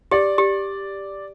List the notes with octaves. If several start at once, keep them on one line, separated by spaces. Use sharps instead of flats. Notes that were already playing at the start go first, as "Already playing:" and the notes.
G4 D5
G4